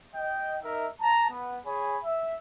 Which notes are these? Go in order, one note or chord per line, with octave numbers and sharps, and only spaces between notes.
D#5 G5
D#4 A#4 E5
A5 A#5
B3
G#4 C#5 G#5 B5
E5